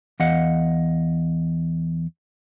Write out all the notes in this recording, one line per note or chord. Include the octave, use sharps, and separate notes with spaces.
E2 D#5 F5 F#5